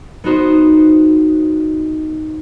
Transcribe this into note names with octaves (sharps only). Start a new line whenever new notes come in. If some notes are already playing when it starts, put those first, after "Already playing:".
B3 D#4 F#4 C5